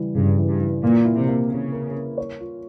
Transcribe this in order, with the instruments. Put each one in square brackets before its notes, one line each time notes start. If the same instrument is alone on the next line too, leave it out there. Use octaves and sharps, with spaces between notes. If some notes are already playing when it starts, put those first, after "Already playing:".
Already playing: [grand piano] C#3 E3 G3
[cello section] G2 [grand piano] C#3
[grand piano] E3
[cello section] G2
[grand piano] E3
[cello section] A#2 [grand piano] A#3
[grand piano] E4
[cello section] C3
[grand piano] A#3
[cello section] C#3 [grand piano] A#3
[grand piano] A#4
A#4
C#5
F4